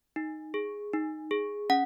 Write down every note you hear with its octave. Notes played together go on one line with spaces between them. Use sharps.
D#4
G#4
D#4
G#4
C#4 F#5